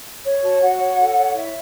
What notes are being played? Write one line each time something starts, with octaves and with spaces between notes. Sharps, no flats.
C#5
F#4 A5
F#4 F#5
C#5
A4
C#5
E4 E5